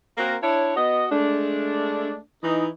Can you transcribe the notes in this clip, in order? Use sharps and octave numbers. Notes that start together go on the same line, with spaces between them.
A#3 C4 F#4 A#4
D4 E4 C#5
B3 F#4 D#5
G#3 A3 D4
E3 D#4